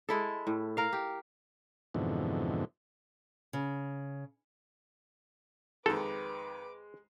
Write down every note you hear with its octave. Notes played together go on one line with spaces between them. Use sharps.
G#3 E4 A4
A2
A#4 F5
G4
F2 G#2 B2 D3 E3
C#3
F2 D#3 G#3 A4 B4 D6